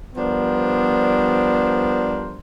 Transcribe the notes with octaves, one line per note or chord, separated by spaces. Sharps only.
F3 G3 B3 D4 A#4 C5